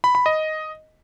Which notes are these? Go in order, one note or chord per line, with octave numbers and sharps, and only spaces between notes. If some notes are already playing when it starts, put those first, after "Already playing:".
B5
B5
D#5